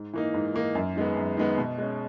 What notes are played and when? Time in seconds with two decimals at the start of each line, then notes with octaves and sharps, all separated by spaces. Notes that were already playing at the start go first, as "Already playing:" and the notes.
Already playing: G#2
0.13 E3 A#3 D#4
0.34 G#2
0.54 E3 A#3 D#4
0.75 F#2
0.96 D#3 G#3 B3
1.17 F#2
1.37 D#3 G#3 B3
1.58 B2
1.78 G#3 C#4